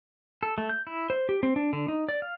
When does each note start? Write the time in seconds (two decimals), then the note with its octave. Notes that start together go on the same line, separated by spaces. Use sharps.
0.43 A4
0.58 A3
0.69 G6
0.87 E4
1.10 C5
1.29 G4
1.43 C4
1.56 D4
1.73 D3
1.88 D#4
2.09 D5
2.22 F5